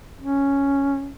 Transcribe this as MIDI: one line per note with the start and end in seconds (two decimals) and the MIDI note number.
0.20 1.12 61